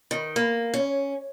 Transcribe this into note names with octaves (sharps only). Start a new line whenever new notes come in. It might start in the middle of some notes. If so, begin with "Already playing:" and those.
D#3
A#3
C#4